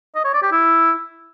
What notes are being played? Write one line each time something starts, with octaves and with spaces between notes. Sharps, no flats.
D#5
C#5
D5
G4
E4